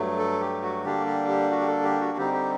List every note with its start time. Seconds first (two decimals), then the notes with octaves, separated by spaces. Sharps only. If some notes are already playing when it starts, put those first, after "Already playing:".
Already playing: G2 F#3 A3
0.18 A4
0.40 G4
0.62 F#4
0.84 D3 G3 A#3 D4 G4
1.07 G4
1.29 G4
1.51 F#4
1.61 G4
1.67 A4
1.84 G4
2.00 F#4
2.18 D3 G3 C4 D#4 G4
2.33 G4